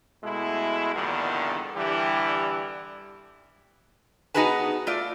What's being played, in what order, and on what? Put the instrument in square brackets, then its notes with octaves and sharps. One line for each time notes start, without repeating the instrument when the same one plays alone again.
[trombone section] B2 G#3 A3 E4
E2 G2 A#2 D3 D#3
D3 E3 G3 E4 G4
[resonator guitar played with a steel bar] B3 D#4 F#4 G#4 B4 A5
A3 F4 D5